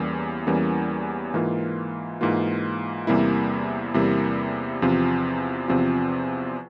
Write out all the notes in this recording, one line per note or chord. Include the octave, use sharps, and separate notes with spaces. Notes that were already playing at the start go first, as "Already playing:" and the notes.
Already playing: E2 E3 G3 A#3 C#4
E2 E3 G3 A#3 C#4
G#2 E3 A#3 F4
G#2 E3 A#3 F4
E2 C3 G3 A#3 E4
E2 C3 G3 A#3 E4
E2 C3 F3 C4 F4
E2 C3 F3 C4 F4